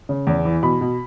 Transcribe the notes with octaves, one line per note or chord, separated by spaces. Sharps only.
C#3
E2
E3
B2 B5
B2